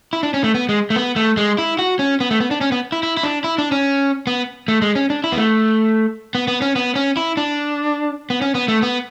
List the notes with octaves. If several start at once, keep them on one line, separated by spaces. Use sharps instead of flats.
E4
D4
C#4
A3
B3
G#3
A3
B3
A3
G#3
E4
F#4
C#4
B3
A3
B3
D4
C#4
B3
E4
E4
E4
D4
E4
D4
C#4
B3
A3
G#3
C#4
D4
E4
B3
A3
B3
B3
C#4
B3
C#4
E4
D4
B3
C#4
B3
A3
B3